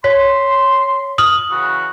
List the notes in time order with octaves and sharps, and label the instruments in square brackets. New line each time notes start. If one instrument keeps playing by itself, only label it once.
[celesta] C#5 B6 [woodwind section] C6
[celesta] D#6 F6 F#7
[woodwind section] C#3 E3 F#4